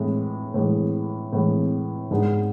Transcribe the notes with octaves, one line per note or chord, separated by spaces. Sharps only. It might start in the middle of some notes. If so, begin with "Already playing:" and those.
Already playing: A2 E3 G#3
A2 E3 G#3
A2 E3 G#3
G#2 G#3 B3 D4 G#4